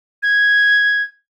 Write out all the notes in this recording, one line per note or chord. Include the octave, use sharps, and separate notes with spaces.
G#6